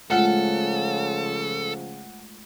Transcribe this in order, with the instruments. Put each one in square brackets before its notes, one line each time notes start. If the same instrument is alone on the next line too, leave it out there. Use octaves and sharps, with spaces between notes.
[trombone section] C#3 F3 [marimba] G#3 A3 F4 [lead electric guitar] A4 [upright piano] F#5